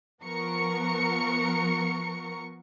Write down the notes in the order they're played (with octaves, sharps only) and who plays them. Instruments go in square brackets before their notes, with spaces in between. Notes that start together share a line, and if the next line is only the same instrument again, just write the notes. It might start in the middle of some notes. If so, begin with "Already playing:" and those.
[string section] F3 B3 A#4 C#6 C#7